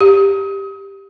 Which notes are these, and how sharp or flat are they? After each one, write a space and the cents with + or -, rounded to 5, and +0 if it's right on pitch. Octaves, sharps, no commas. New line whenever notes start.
G4 +5